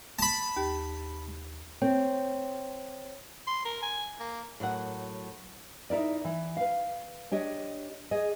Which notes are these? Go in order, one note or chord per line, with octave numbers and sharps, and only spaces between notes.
A5 B5
D#2 G4
C4 C#5
C6
A#4
G#5
A#3
A2 F#3 A#4 F#5
D#4 E4 A#4 D5
E3
B4 F5
D4 G4 C#5 D#5
G#4 D#5